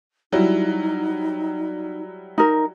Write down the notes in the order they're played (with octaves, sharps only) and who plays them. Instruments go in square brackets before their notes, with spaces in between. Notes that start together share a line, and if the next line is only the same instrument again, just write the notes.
[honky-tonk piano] F#3 G3 E4 [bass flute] D#4
[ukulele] D#4 A#4